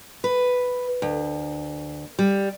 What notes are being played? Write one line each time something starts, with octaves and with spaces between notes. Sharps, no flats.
B4
D2
G3